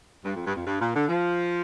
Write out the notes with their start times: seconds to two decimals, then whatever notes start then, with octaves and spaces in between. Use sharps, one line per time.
0.25 G2
0.35 F2
0.46 G2
0.56 F2
0.66 G2
0.81 A#2
0.94 D3
1.08 F3